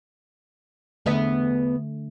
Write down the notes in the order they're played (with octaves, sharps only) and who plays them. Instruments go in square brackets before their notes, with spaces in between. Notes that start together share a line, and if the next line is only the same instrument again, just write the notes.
[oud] E2 B3 E5 [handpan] D3 A3